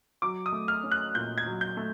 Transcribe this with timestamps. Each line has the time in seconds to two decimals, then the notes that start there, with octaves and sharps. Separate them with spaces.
0.22 F#3 D6
0.46 D#6
0.52 A3
0.68 F6
0.83 C#4
0.91 F#6
1.15 A#2 G6
1.38 G#6
1.46 F#3
1.61 G6
1.77 A3